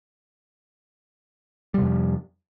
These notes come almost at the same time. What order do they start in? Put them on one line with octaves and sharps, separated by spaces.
G3 C3 F2 F3